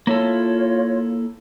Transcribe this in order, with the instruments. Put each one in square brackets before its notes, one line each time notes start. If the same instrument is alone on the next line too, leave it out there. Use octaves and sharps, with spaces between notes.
[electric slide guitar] A#3 E4 A4 [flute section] F4 C#5